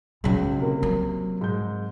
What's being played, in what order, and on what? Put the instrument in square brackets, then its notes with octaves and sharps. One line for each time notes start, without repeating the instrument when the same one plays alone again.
[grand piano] C#2 [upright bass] C#3 F#3
[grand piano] C3 A#3
[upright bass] F#3
[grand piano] G#2 G6